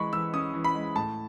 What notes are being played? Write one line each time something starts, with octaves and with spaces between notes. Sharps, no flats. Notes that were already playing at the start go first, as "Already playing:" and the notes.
Already playing: E3 G#3 B5 C#6
E3 E6
C#4 D#6
E3
B5
G#3
A2 A5